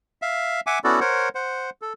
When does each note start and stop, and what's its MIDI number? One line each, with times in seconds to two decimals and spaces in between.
0.22 0.60 76
0.22 0.60 77
0.67 0.79 76
0.67 0.79 78
0.67 0.79 80
0.67 0.79 86
0.84 1.00 59
0.84 1.00 61
0.84 1.00 64
0.84 1.00 66
0.84 1.00 69
0.84 1.00 74
1.01 1.29 70
1.01 1.29 72
1.01 1.29 73
1.01 1.29 78
1.35 1.70 72
1.35 1.70 78
1.82 1.93 69